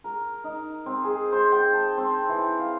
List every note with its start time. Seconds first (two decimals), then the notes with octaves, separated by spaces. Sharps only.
0.04 A#4
0.44 D#4
0.86 C4
1.04 G#4
1.32 C5
1.52 G5
1.73 A5
1.97 C4
2.29 E3
2.59 F5